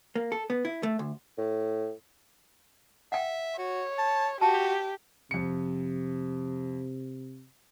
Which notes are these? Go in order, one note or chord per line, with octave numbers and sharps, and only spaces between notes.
A#3
A4
B3
E4
A3
D2
A2
E5 F#5 G5
F#4 C#5
A5
F#4 G4 A5
F2 C3 C#7